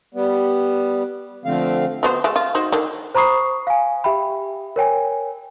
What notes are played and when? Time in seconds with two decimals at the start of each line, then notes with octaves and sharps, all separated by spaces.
0.14 G3 B3
1.45 D3 F3 A3 C4 F5
2.03 F#3 B3 C5
2.24 G#3 A3
2.36 F4
2.55 D#4 F#4 C5
2.72 D3 D#3
3.15 C5 A#5 B5 C#6 D#6 C7
3.67 F5 G#5
4.04 G4 E5 G5 B5
4.76 A#4 C#5 G5 G#5